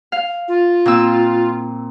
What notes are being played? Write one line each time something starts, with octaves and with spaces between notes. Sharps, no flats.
F5
F4
A#2 C4 E6